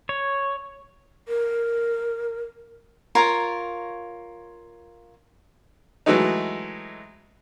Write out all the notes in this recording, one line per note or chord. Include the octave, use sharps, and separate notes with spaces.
C#5
A#4
F4 A#4 C#5 A#5
E3 F#3 G#3 A3 D#4